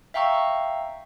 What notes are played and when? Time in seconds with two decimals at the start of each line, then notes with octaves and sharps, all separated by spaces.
0.14 E5 F5 G5 A#5 C#6 E6